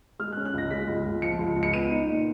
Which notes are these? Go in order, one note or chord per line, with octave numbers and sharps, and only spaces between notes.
G#3 F6
F#6
C#4
F#6
C#2 A#6
G#3 B6
C#2
C#2
F3 C#7
C#2
C#2
C#7
B3 D#7
D#4
A#2